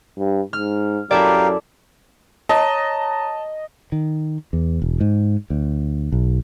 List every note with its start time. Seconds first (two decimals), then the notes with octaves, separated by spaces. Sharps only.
0.18 G2
0.53 G#2 F6
1.11 F#2 E4 G4 A4 A#4 D5 F5
2.49 C#5 D#5 A5 A#5
3.92 D#3
4.53 E2
4.82 E1
5.00 G#2
5.50 D2
6.12 B1